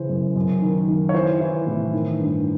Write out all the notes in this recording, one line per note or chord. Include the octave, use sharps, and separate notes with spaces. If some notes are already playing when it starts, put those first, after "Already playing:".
Already playing: C#3 E3 C5
F#2
F#2
D#3
D#3
C#5
E3 C5
E3
A2
D#3
G2